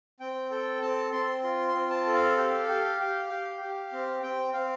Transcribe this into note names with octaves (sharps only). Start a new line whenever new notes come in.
C4 G5
A4 G5
C4 A5
C4 C6
F4 C6
C6
C4
A5
A4
F5
G4
G4
G4
G4
G4
C4
C4 G5
C4 F5